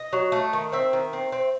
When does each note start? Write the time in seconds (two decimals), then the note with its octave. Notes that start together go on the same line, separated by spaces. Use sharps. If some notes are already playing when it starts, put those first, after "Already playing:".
Already playing: D#5
0.13 F#3
0.32 A3
0.53 D#3
0.72 C4 E5
0.93 D#3
1.13 C4
1.32 C4